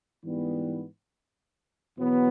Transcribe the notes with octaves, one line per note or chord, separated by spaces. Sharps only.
G#2 E3 G3 B3
E2 B2 F#3 B3